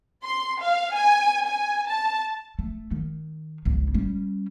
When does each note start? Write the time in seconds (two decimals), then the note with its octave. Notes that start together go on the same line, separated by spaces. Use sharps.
0.23 C6
0.60 F5
0.95 G#5
1.47 G#5
1.88 A5
2.59 A3
2.91 D#3
3.65 G1 C#2
3.94 G3 C#4